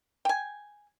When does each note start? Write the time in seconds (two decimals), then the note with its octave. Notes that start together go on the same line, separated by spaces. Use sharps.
0.25 G5 G#5